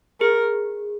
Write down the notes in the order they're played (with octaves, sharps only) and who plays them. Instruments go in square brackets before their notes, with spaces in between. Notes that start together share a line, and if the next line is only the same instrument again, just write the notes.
[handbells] G#4 [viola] A#4